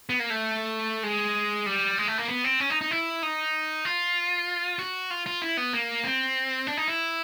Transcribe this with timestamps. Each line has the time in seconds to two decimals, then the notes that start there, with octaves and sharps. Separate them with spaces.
0.09 B3
0.20 A#3
0.30 A3
1.03 G#3
1.66 G3
1.98 G#3
2.08 A3
2.18 A#3
2.28 B3
2.44 C4
2.60 C#4
2.70 D#4
2.81 D#4
2.91 E4
3.23 D#4
3.85 F4
4.79 F#4
5.11 F4
5.26 F4
5.42 E4
5.57 B3
5.73 A#3
6.04 C4
6.67 D4
6.77 D#4
6.88 E4